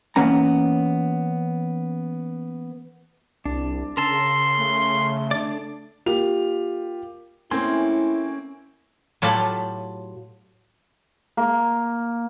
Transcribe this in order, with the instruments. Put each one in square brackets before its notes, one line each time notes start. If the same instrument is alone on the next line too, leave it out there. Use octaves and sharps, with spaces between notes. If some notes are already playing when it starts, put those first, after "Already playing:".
[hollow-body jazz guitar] E3 A#3 B3 C#4 A#5
[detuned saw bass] C2 [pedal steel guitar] D4
[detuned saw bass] C#3 [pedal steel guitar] A#4 A5 E6 [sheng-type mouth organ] C6
[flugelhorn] A3
[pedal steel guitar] D4 D5
[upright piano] A#3 F4 G4 F7
[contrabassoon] A2 [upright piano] A#3 C4 [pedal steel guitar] C#4 G#5 C6 [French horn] E4
[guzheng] A2 F#3 F4 G4 A4 B5
[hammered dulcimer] A#3